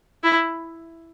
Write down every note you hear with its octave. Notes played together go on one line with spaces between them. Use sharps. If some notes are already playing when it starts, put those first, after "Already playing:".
E4